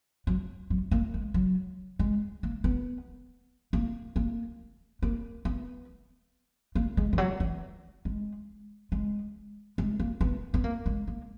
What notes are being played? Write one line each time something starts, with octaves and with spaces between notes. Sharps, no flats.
F#3
F#3
A#3
G#3
F#3
G#3
A#3
B3
A#3
A#3
A#3
B3
A#3
G#3
E3
F#3
E3
G#3
G#3
G#3
A#3
B3
B3
A#3
G#3
A#3